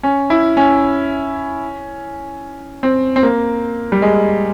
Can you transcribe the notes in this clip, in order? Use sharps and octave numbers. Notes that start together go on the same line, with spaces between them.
C#4
E4
C#4
C4
C4
A#3
G3
G#3